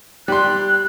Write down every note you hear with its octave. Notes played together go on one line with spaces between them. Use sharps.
G3 C6 F#6